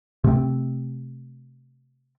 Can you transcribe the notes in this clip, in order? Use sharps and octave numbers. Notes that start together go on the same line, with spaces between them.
C3 A3 A#3 C4